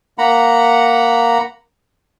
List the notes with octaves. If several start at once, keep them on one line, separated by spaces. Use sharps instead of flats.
A#3 F#5 A#5 B5